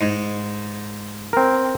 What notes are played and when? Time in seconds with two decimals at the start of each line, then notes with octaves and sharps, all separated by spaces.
0.01 G#2
1.33 C4 A#4